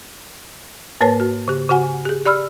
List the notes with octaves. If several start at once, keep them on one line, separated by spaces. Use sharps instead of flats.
G#2 A#3 A#4 B4 C#5 A5
F#4
C#3 G4
C#3 F#4 F#5 G#5
G4 G#4
G4 D5 B5 E6 F6